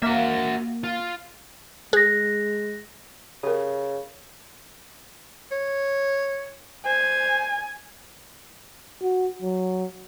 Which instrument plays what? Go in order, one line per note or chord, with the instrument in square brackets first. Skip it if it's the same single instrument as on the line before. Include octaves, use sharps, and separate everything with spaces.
[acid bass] A#3 [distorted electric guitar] F#4 E5
[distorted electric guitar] F4
[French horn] G#3 [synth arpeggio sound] G#4 [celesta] F#6 A#6
[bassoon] C#3 [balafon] G4 A#4
[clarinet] C#5
[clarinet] C5 [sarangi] G#5
[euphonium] F#4
F#3